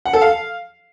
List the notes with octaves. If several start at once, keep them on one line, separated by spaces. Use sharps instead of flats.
F#5
A4
F5